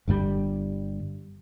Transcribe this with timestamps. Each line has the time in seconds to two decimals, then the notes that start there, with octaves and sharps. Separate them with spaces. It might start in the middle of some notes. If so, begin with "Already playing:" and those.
0.08 G1 G2 A#2 G3